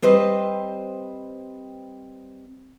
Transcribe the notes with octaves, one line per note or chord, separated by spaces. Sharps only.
G3 C4 B4 C5 D#5